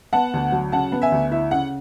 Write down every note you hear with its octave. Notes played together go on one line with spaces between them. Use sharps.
B3 F#5 A5
D2
F#3
C#3 F#5 A5
B3
E5 G#5
D2
E4 E5
C#3 F#5